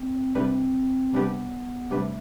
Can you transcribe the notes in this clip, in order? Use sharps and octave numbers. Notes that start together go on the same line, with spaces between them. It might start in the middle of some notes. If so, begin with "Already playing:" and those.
Already playing: C4
C3 G3 C4 D4 G4 B4
C3 G3 B3 D4 G4 B4
C3 G3 A3 D4 G4 B4